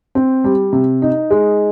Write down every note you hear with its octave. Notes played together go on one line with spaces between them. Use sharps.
C4
G3
C3
D#4
G#3